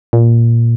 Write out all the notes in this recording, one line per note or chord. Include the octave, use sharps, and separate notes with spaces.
A#2